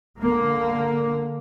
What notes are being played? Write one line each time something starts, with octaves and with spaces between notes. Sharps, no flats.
D3 A#3